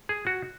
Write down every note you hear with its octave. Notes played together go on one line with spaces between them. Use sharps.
G#4
F#4